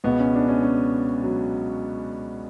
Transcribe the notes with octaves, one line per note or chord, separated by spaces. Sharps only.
C#2 B2 B3
C#4
D4
C#4
C#4
F#3